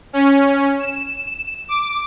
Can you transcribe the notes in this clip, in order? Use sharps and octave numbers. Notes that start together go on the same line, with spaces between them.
C#4
E7
D6